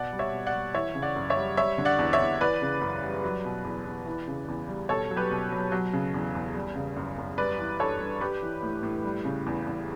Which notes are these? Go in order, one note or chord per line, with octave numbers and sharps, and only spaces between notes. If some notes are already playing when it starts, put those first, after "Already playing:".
Already playing: B2 D5 F#5
G3
C#5 E5
B2
D5 F#5
G3
E3 C#5 E5
C#3
D5 F#5
F#2
C#5 E5
G3
G3 C#5 E5
D3
D5 F#5
E2
C#5 E5
E2
E3 B4 D5
C#3
F#2
G3
F#3
B2
E2
E2
E3
C#3
E2
G3
B2 A4 C#5
F#3
G4 B4
B2
F#3
F#3
C#3
E2
E2
G3
C#3
F#2
F#2
G3 B4 D5
E3
G2 A4 C#5
G2
G3 G4 B4
E3
A2
A2
G3
C#3
E2
E2